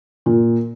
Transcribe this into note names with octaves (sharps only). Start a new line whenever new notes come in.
A#2